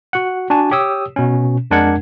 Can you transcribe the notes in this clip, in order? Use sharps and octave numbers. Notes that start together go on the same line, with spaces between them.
F#4 F#5
D4 F#4 G#5 A5
G4 C#5 D#6 E6
B2 C#4
F2 G#3 D4 A#4 F#5 G#6